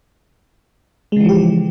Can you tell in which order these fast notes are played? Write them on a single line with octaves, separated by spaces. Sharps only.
G#3 C#3 E3 F3 G4